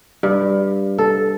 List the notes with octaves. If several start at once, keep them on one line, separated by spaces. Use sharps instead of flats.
G2
A4